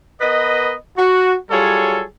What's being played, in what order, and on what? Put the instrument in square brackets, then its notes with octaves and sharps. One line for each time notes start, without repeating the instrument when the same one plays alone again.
[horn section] B3 A#4 B4 D#5
F#4
F#3 G3 F4 G#4 A4 C#5